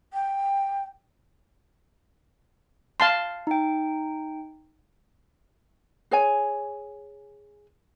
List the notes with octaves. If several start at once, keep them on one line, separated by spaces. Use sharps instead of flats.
G5
F5 A5 C6
D#4 G5
G#4 C#5 G#5